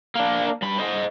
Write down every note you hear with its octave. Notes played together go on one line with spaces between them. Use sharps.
A#3 D4
G2 B5
C5 D#5